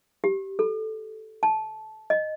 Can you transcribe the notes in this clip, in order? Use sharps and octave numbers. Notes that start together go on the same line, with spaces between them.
G4
A4
A5
D#5